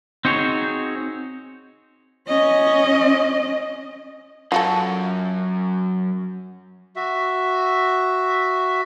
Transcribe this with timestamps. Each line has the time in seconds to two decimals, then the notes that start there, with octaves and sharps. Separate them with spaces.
0.25 C4 D#4 F#4 G#4 C#5
2.28 C#4 D#5
4.52 F#2 F4 F#4 A4
6.96 F#4 E5